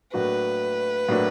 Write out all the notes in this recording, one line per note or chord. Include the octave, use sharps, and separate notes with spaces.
A2 F#3 A#3 D4 F#4 B4
A2 F#3 A#3 D4 F#4